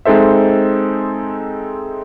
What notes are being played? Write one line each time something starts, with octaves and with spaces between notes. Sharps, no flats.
G#3 C4 D#4 A4 C5 E5